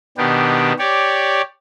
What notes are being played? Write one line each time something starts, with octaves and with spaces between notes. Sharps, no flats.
B2 D#3 B3 D4 G4
G4 C#5 D5